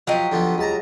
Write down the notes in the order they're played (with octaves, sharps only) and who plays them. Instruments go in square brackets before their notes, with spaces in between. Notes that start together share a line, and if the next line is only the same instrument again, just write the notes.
[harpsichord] F3 F5 [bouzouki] F#3 G4 D#5
[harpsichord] D3 F3 B3
C#2 A5 A#5